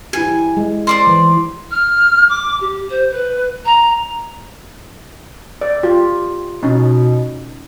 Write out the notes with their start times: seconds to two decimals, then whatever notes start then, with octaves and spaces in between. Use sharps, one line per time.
0.13 E4 G4 G#5
0.57 G#3
0.87 C5 D5 C6
1.07 E3
1.70 F6
2.28 D6
2.60 G4
2.89 C5
3.10 B4
3.65 A#5
5.61 D5
5.83 F4 G4
6.63 B2 C#4 D#4